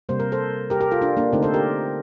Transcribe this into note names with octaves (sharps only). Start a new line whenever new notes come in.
C3 G3 A#3 C5
A#4
A4 C5
G4 A#4
G4 A#4
F4 A4
D4 F4
A#3 D4
D3 A3 C4 D#4
A4 C5
G4 A#4